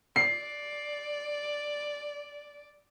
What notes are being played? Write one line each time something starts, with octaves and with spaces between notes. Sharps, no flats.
D5 C7